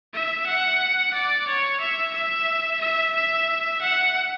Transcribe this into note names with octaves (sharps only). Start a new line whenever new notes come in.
E5
F#5
D5
C#5
E5
E5
E5
E5
F#5